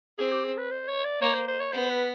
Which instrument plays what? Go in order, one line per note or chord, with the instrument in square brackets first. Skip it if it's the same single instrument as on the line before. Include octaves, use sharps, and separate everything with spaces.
[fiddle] C4 [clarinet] G#4
[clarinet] G4
G#4
B4
C5
C#5
D5
[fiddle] A#3 [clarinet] C#5
[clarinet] C5
C5
C#5
[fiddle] B3 [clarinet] C5
[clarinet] B4